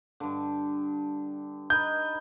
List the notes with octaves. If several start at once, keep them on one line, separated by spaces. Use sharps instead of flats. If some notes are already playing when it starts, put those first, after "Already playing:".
G2 D3
D#4 B4 G6